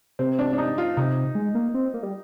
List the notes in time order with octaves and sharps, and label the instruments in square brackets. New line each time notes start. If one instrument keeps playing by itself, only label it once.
[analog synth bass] C3 [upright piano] C4
[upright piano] D4
D4
D#4
F4
[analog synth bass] C3 [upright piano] D#4
[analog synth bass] G#3
A#3
C4
A#3
G3